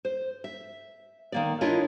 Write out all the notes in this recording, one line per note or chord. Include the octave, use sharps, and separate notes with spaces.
C5
E5
D#3 A#3 D5
D4 E4 F4 A#4 C#5 D#5